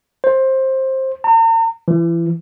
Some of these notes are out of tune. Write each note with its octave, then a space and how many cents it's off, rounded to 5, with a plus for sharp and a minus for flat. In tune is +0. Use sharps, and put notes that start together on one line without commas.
C5 +15
A#5 -45
E3 +30